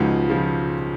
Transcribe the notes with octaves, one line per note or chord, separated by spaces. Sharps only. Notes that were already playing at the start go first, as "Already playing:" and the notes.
Already playing: C#2 C#3 F3 D#4 F#4
C#3 F3